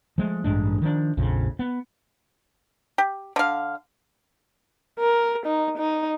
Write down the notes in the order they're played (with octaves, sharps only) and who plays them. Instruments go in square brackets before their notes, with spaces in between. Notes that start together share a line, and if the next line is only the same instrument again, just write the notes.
[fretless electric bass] F3 G#3 A3
A1 G2 G#3 D4
D#3 F3 D4
A#1 F2 C#3
B3
[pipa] G4
D3 F5
[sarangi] A#4
D#4
D#4